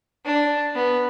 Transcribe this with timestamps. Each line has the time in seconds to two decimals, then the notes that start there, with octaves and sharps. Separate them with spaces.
0.25 D4
0.75 B3